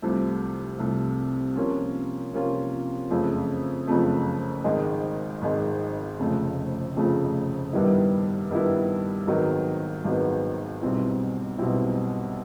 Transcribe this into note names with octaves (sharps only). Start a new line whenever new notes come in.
C2 C3 F3 A3
C2 C3 F3 A3
C3 F3 A#3 C#4 F4
C3 F3 A#3 C#4 F4
F#1 F2 C#3 F3 A3
F#1 F2 C#3 F3 A3
G#1 G#2 D#3 G#3
G#1 G#2 D#3 G#3
F1 F2 C#3 F3 A3
F1 F2 C#3 F3 A3
G2 D#3 G3 B3 E4
G2 D#3 G3 B3 E4
G#1 G#2 D#3 F#3 B3
G#1 G#2 D#3 F#3 B3
B1 B2 G3 C4 E4
B1 B2 G3 C4 E4